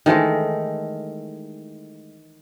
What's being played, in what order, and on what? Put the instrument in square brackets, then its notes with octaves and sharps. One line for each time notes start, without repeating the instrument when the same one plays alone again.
[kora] D#3 E3 G#3 A3